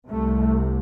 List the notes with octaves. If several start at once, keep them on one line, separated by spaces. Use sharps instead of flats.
C2 C3 A3